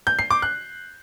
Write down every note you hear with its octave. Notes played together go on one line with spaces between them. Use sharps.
G6
C7
D6
F#6